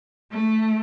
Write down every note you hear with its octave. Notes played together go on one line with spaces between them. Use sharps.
A3